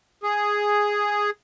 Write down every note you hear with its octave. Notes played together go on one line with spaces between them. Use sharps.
G#4